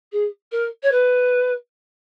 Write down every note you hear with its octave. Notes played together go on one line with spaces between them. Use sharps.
G#4
A#4
C#5
B4